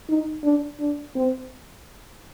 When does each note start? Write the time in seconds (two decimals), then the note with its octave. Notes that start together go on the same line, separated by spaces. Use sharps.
0.09 D#4
0.44 D4
0.80 D4
1.15 C4